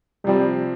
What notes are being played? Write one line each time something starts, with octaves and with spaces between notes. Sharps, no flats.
C3 F3 G3 C4